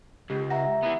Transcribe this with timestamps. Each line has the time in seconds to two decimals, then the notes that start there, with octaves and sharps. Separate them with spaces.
0.30 C#2 G4
0.50 E5 F#5 A#5 A#6
0.83 E3 B3